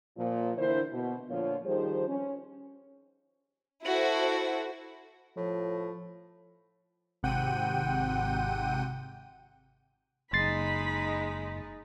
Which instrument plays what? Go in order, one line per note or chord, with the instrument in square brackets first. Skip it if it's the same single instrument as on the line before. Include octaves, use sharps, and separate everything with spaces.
[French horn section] A#2 F3
D3 E3 D4 E4 A#4 C5
B2
A#2 D3 F3 F4 C#5
D#3 F3 G3 G#4 C5
C#4
[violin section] E4 F#4 A4 C5
[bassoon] A2 [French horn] F3
[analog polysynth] G#1 C3 F#5 G5 D#7
[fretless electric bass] F#1 [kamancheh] G#3 D#4 [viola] B5 [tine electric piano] C6 A6 C7